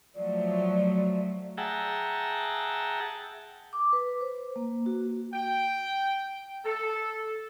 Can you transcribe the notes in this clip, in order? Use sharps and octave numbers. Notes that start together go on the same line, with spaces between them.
F3 F#3 A3 D5
G#4 E5 F#5 G5 A5 A#5
D6
B4
C5
A#3
F#4
G5
A4